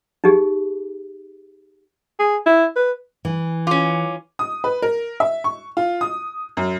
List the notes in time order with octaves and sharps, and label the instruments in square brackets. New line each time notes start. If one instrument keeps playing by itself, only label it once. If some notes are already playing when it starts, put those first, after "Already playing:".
[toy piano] D#4 G4 G#4
[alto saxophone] G#4
E4
B4
[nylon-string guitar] E3
[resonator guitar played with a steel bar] C#4 F4 [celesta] D6
[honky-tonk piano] D#6
B4
A#4
E5
C#6
F4
D#6
F#2